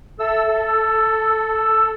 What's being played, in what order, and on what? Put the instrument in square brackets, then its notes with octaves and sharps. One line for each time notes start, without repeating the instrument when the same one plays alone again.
[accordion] A4 E6 [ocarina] E5
[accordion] A4
[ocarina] E6
E6